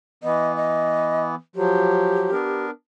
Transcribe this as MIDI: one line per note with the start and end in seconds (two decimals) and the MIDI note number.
0.23 1.35 52
0.23 1.35 59
0.23 0.56 75
0.56 1.23 75
1.56 2.31 53
1.56 2.31 54
1.56 2.64 67
2.31 2.70 59
2.31 2.70 62
2.31 2.70 70